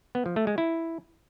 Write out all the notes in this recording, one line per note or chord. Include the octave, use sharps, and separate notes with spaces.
B3
F3
A3
G#3
E4